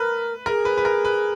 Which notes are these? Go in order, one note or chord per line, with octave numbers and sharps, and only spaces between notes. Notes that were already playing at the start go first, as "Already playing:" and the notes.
Already playing: A#4 B4
G#4 A#4
B4
B4
A#4
B4